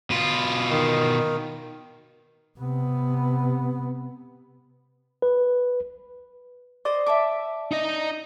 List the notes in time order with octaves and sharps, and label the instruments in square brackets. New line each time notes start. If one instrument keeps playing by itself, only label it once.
[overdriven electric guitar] B2 F4
[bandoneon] D#3
[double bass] C3 B3
[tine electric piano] B4
[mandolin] C5 D#5 [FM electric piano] D5
[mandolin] E5 A5 D6
[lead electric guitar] D#4 D#5